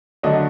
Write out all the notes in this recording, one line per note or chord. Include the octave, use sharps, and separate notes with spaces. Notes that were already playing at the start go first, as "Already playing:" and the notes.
D3 F#3 A3 D4 D#5